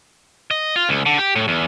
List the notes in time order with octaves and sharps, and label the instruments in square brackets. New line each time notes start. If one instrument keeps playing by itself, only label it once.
[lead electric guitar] D#5
F4
C#2
D3
G4
A2
E2